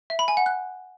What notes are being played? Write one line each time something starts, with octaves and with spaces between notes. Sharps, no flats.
E5
B5
G#5
F#5
F#6